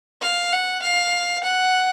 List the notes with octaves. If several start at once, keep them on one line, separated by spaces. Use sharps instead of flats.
F5
F#5
F5
F#5